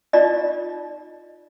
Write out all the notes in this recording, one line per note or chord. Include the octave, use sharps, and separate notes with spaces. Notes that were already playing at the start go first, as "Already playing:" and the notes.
D#4 F4 D5 D#5